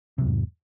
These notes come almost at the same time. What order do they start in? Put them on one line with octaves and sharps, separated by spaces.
C3 F#3 E2 G#2